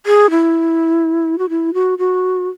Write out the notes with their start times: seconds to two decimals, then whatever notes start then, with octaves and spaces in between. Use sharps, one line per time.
0.06 G#4
0.30 E4
1.39 F#4
1.49 E4
1.74 F#4
1.99 F#4